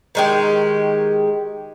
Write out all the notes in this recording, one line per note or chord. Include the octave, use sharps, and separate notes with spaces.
D#3 G#3 G4